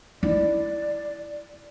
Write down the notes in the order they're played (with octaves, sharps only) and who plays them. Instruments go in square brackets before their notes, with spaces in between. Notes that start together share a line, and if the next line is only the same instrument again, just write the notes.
[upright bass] E4 [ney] D5